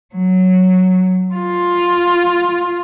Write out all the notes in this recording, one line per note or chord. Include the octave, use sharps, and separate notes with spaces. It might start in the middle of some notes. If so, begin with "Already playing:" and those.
F#3
F4